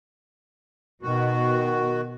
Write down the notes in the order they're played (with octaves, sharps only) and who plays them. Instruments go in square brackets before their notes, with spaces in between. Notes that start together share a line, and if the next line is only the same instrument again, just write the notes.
[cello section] B2 [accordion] D#3 F#4